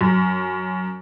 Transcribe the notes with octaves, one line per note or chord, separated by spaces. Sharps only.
F#2